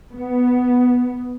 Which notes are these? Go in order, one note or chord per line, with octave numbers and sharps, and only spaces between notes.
B3